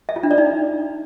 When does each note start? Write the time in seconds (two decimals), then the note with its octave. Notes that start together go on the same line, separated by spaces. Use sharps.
0.09 E5
0.16 F4
0.23 D4
0.31 D5
0.38 D#4